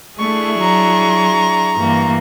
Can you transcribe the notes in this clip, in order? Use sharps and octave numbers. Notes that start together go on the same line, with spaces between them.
A3 D4 E4 G#4 C#6
F#3 A#5
G2 E3 A#3